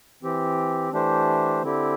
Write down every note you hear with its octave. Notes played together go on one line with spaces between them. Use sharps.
E3 C4 G4
E3 A3 D4 G4 C5
D3 C4 E4 G4